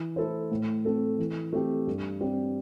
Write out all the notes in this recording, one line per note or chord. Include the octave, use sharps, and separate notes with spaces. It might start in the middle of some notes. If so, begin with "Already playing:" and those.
Already playing: E3
A3 E4 A4 C5
A2
A3 C4 A4
E3
A3 C4 G4
G2
G3 C4